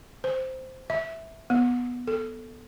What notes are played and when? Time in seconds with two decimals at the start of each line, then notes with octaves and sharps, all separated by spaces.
0.24 C5
0.90 E5
1.50 B3
2.07 A4